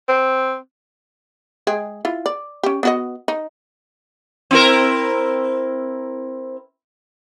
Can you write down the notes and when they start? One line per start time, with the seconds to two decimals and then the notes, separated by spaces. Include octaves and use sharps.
0.08 C4
1.67 G#3 G#4 G5
2.05 E4 F4
2.26 D5
2.63 C#4 G4
2.83 B3 F#4 D#5
3.28 D#4
4.51 C4 E4 A#4